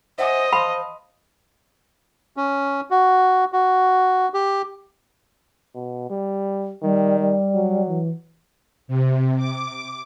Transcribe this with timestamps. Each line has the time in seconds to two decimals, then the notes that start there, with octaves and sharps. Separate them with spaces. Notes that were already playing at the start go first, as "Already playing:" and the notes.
0.18 C5 D#5 E5 F#5 G#5
0.53 C5 F5 A5 B5 C6
2.37 C#4
2.91 F#4
3.53 F#4
4.34 G4
5.75 B2
6.10 G3
6.82 D#3 G3
7.19 G3
7.55 F#3
7.86 E3
8.88 C3
9.37 D6